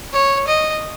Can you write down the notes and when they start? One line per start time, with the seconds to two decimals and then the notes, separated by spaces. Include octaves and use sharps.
0.13 C#5
0.47 D#5